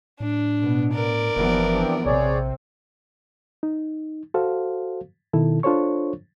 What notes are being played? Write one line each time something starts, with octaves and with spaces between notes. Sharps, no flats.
A2 D4
B2 B3
A#4 D5
F#1 D#2 E3 F3 B3
C4 D4 G4
A#1 C3 C4 G#4 C#5 D5
D#4
F#4 A4 C5 F5
B2 D#3 E4 A4
D4 F4 A4 C5 C#5 C#6